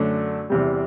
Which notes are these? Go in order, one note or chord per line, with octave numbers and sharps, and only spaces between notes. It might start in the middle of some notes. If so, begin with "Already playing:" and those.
Already playing: F#2 D3 A3 D4
E2 C3 G3